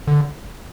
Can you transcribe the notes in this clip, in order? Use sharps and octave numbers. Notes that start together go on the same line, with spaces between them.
D3